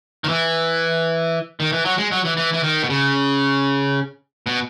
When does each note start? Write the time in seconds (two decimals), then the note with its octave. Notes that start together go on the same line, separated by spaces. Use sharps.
0.24 D#3
0.29 E3
1.60 D#3
1.72 E3
1.85 F#3
1.98 G#3
2.12 F#3
2.25 E3
2.37 E3
2.53 E3
2.63 D#3
2.83 B2
2.90 C#3
4.47 B2